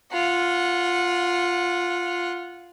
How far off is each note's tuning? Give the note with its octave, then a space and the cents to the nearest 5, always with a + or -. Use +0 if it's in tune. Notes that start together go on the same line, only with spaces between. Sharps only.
F4 +0 F#5 -20